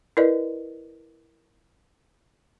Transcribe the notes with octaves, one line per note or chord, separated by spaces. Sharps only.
E4 A#4 B4 D5 D#5